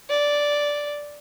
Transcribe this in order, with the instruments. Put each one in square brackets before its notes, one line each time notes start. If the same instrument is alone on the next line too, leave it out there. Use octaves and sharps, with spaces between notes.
[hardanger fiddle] D5